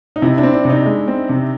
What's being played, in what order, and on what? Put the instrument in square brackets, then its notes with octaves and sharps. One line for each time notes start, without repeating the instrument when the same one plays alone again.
[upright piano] D#4
[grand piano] C3 [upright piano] E4
[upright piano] D4
[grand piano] C4
[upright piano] D4
[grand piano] C3 [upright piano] D#4
[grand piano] G#3
C4
C3